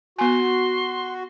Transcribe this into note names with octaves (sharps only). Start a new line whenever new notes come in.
B3 F#4 G#5 C6